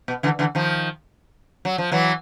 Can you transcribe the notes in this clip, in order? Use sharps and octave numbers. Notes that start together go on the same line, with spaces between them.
B2
D3 E3
D3 E3
D#3 F3
F#3
F3
E3 F#3